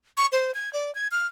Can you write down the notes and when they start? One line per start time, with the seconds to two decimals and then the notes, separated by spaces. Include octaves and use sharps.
0.17 C#6
0.32 C5
0.54 G#6
0.73 D5
0.95 G#6
1.11 F6